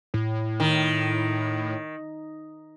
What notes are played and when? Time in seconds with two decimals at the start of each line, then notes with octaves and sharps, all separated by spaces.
0.14 A2
0.60 D#3